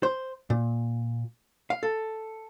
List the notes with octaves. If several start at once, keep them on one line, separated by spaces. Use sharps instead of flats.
C5
A#2
F5
A4